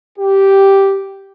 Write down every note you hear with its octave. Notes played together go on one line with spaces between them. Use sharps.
G4